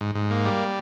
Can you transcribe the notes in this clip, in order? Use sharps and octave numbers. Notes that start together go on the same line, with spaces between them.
G#2
G#2
A#3
G3